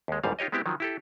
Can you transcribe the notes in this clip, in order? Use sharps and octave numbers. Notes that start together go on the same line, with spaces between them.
D#2 G#3
A1 D#2 G#2 G3 F5
D#4 F4 G4 C#5 D#5
G#3 B3 C4 E4 G4
D#3 F3 F#3
E4 G4 A4